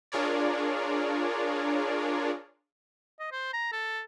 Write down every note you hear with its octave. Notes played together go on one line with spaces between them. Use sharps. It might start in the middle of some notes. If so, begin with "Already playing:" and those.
D4 F4 G#4 A#4 C#5 D5
D#5
C5
A#5
A4